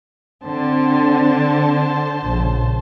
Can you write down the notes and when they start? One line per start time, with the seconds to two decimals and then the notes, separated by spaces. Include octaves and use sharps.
0.45 D3 C4 C5 A5
2.23 A#1 C#3